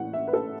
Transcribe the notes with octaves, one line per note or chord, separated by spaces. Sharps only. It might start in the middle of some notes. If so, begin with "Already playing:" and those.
Already playing: A2 E3 F#5
E5
B4
A4